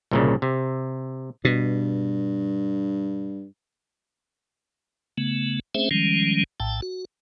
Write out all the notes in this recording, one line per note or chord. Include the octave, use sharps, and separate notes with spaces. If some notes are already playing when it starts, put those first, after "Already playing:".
C2 A#2 C#3
C3
G2 B2
C#3 A3 B3
A3 C4 C#4 G#4 C5 E5
D#3 F3 G3 G#3 C#4
A#1 A2 G5 A5
F#4